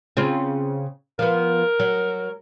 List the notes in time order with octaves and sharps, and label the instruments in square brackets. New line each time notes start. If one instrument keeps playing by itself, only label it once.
[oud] C#3 C4 F4
[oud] F3 B3 [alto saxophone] A#4
[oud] F#3